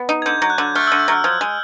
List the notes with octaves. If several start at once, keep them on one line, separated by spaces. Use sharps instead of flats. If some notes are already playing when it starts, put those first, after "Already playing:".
Already playing: B3
D#4
G#6
D3 G6
F#3
F#6
D3
A3 F6
E6
D3
E6
F#3 F6
F3 G#6
G#3